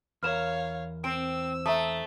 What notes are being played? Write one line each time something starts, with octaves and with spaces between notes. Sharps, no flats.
E2 A#4 C#5 F5 F6 E7
C4 E6 D7
A3 E5 A#5 D#6